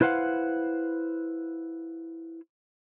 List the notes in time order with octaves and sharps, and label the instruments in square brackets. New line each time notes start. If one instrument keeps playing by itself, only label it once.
[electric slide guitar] E4 B4 C5 F5 F#5